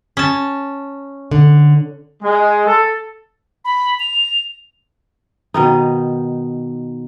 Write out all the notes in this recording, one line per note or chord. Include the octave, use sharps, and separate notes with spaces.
C#4 A5
D3
G#3
A4
B5
F7
B2 D#3 D#4